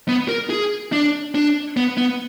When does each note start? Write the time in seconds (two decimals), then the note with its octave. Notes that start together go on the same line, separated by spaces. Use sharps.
0.08 B3
0.29 A#4
0.50 G#4
0.92 D4
1.35 D4
1.77 B3
1.98 B3